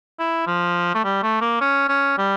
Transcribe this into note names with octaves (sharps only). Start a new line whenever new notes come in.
E4
F3
A3
G3
A3
A#3
C#4
C#4
G3